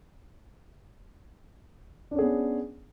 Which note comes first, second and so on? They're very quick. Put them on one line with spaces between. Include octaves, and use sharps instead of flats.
D4 C#4 G#4 B3